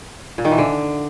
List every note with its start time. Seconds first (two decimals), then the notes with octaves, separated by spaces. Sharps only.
0.38 A#2
0.45 D#3
0.51 E3
0.58 D3